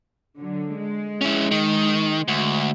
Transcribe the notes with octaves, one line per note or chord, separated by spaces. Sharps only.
D3 F#3
G#3
C#4 E4
D#3
D2